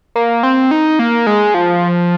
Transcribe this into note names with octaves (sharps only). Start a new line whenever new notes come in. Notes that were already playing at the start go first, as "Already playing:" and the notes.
A#3
C4
D#4
A#3
G#3
F3